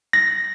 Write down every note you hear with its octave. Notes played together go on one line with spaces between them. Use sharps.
A#6